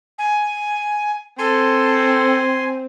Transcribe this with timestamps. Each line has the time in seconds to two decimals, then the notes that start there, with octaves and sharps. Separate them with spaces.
0.18 G#5
1.39 C4 A4 G#5 C6